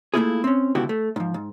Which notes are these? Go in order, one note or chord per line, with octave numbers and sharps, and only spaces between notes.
A3 A#3 C#4 E4 F4 G#4
C4 C#4
C#2 B2 D3 E4 F#4 G4
A3
G#2 F3
G#2